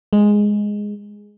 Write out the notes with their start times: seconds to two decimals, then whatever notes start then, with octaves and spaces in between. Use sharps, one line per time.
0.13 G#3